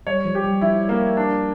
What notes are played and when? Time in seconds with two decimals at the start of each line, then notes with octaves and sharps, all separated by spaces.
0.07 G3 C#5
0.25 F3
0.35 G4
0.44 G3
0.61 F3 E4
0.89 A#3
1.17 D4